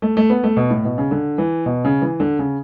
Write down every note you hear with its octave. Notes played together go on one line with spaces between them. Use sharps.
A3
A3
B3
A3
B2
A2
B2
C#3
D3
E3
B2
C#3
E3
D3
C#3